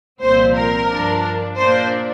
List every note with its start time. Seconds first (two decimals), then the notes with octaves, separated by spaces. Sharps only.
0.21 C2 A#2 F3 C4 C5
0.55 A#4
0.89 G2 F3 D4
1.57 A#2 A#3 D4 C5